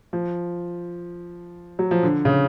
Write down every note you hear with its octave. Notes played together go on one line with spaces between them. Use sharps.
F3
F#3
F3
D3
C#3